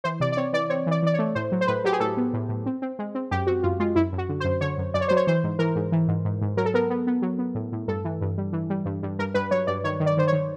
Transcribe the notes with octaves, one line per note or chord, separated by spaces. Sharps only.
E3 C5
C3 D5
D5
C4 C#5
E3 D5
C4 C#5
E3 D5
E3 D5
C#5
A3
A2 C5
F#3
C5
A2 B4
F#3 G4
G#4
A2 A4
B3
A2
A2
C4
C4
G#3
C4
F#2 G4
C4 F#4
F#2 F4
G#3 F4
F#2 E4
F#2
F#4
D3
C5
F#2
D3 C#5
F#2
F#2 D5
C#5
F#3 C5
C#5
E3 C5
G#2
E3 A#4
G#2
E3
G#2
G#2
G#2
F#3 A#4
A4
B3 A#4
B3
B3
F#3
B3
A2
A2
G2 A4
E3
G2
G3
E3
G3
G2
G2
G2 A#4
G2 B4
F#3 C#5
G2 D5
D#3 C#5
D#3
D5
D#3 C5
C#5
D#3